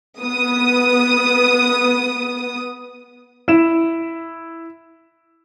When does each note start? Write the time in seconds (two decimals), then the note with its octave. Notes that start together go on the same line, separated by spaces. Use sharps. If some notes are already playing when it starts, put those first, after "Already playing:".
0.21 B3 D#6
3.48 E4 E7